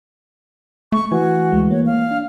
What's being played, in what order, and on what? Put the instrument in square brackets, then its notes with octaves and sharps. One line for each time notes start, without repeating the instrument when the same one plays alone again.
[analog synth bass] A3 [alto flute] C#6
[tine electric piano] E3 [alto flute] F#4 [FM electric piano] G#5
[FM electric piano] D2 G#3
[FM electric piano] A#3 [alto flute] C#5
[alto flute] F5
[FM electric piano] D4